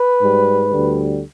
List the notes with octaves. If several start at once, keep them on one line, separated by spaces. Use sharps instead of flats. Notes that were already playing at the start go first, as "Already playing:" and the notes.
Already playing: B4
G#2 G3
D2 D3 G3